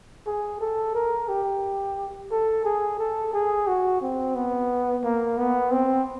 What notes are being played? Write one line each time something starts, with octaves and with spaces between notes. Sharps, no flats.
G#4
A4
A#4
G4
A4
G#4
A4
G#4
F#4
C4
B3
A#3
B3
C4